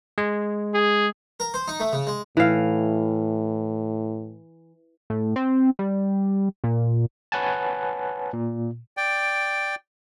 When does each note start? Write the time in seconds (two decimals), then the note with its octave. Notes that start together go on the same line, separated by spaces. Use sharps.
0.18 G#3
0.74 G#4
1.40 A#4
1.54 C5
1.68 D#4
1.80 A3
1.93 C#3
2.07 G#3
2.37 A2 E3 F5
5.10 A2
5.36 C4
5.79 G3
6.64 A#2
7.32 B4 C#5 F#5 G#5 A5
8.33 A#2
8.97 D5 G5